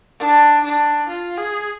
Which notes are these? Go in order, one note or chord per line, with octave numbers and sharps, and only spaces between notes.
D4
D4
F4
G#4